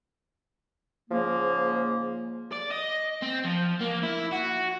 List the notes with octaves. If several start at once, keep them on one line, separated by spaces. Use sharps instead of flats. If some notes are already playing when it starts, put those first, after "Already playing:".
G#2 C#3 F3 A#3
D5
D#5
C4
F3
A#3
E4
F#4